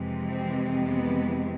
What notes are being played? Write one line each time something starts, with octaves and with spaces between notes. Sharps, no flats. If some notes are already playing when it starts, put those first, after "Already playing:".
Already playing: F2 C3 E3 G#3
C4
B3